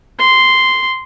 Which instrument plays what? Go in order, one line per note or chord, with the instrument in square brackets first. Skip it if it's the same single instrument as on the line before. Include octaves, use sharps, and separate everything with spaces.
[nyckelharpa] C6